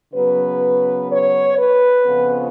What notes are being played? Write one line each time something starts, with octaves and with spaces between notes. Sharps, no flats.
C#3 F#3 B3 B4
C#5
B4
F2 C#3 F3 B3